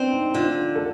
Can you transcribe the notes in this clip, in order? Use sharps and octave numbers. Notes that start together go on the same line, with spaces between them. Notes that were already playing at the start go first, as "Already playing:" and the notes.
Already playing: C4 D4
D#4
D#4
D3 F4
A4